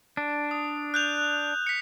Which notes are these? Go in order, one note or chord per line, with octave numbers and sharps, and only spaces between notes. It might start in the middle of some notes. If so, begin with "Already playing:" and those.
D4
D#6
F#6 G6 F7
B6 C#7